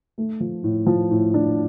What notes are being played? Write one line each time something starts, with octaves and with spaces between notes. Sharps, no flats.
A3
F3
A2
F3
A2
D4